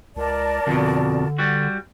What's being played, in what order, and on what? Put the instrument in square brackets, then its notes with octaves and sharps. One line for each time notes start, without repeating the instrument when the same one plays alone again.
[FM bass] C#2 [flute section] A#4 D5 A5
[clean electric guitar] F2 B2 [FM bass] D3
[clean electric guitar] G3 F#4